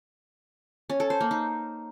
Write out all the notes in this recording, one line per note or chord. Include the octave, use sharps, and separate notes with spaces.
C#4
A4
C5
A#3
D#4